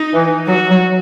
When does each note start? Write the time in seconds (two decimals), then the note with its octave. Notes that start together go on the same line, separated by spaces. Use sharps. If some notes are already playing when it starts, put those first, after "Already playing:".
Already playing: D#4
0.14 E3
0.47 F#3 F#4
0.69 F#3